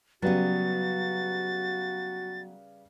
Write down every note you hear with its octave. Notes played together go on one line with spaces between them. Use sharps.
C#3 F#3 G3 B3 F#4 B4 A6